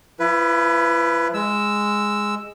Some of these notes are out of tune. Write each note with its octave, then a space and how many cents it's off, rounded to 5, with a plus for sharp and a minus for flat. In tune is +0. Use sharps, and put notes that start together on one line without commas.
F3 +0 E4 +40 B4 +0
G#3 -5 E6 +0